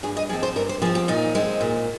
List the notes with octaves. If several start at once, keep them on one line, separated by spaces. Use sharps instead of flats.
G2 G#4
D#5
F3 C4 G#4
C5
G2 A#4
C5
F3 C4 G#4
G4
A#2 D#4
G#3 C4
A#2